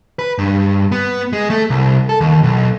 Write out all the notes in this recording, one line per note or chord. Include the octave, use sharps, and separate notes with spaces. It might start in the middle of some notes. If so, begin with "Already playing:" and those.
B4
G2
B3
G#3
A3
C2
A4
D#2
B1